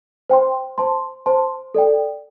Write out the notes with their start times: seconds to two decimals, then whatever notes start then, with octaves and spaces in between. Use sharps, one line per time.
0.30 C5 G5 C6
0.78 C5 A5 C6
1.26 C5 A5 C6
1.75 A4 D5 G5